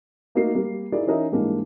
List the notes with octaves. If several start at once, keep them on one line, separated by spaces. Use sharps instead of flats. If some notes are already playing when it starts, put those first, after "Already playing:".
A3 A#3 D#4 F#4 A#4 C7
G3 A#3 A#4
D#4 E4 G#4 A#4 D5
E3 C#4 D#4 A#4 D#5 E5
G#2 E3 G3 G#3 A#3 D4